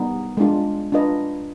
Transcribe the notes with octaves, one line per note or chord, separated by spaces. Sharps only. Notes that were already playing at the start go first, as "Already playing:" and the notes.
Already playing: G3 B3 D#4
G#3 D4 F4
D4 F4 B4 D#5